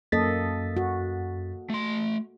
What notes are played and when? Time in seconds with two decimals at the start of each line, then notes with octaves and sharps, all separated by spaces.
0.12 F#2 A#3 A4 D#5 A6 B6
0.77 F#4
1.70 A3 C6